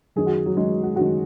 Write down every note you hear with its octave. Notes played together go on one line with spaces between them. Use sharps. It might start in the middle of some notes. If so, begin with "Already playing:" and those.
F#2 D#3 G#4
F#4
F#3
F#2 D#3 G#3
F#4
F#2 D#3 F#4